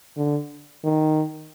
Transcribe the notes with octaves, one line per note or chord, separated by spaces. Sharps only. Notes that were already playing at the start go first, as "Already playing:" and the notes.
D3
D#3